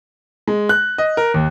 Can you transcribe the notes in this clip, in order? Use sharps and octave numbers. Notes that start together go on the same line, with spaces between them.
G#3
F#6
D#5
A#4
D#2